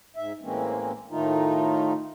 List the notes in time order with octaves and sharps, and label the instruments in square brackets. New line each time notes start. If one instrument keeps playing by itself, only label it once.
[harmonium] G#2 E5
A2 E3 G#3 A#3 C4 C#4
A2 D#3 A3 D#4 F4